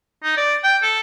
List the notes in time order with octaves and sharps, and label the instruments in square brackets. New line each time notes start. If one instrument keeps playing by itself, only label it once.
[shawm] D#4
D5
G5
A4